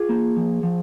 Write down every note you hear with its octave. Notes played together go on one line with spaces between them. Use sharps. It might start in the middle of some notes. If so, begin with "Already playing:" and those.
Already playing: F4 G#4
A#3
F3
F3